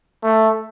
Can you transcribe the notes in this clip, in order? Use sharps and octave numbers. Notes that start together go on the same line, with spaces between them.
A3